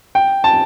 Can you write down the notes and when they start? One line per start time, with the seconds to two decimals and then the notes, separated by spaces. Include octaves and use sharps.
0.15 G5
0.44 A5